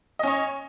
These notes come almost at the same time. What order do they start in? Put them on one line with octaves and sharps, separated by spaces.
D#5 C#4 C#5